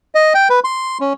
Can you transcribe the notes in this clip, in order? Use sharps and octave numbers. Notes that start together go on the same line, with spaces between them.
D#5
G5
B4
C6
C#4